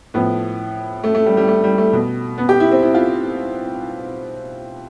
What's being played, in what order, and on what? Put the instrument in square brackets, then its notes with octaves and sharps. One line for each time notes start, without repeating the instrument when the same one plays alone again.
[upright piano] A2 F3 B3
A3
A3
G3
G3
A3
G3
A3
B2
B3
G4
E4
C4
E4
F4